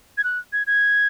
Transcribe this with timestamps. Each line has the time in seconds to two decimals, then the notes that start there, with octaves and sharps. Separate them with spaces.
0.18 G#6
0.24 F#6
0.53 G#6
0.67 G#6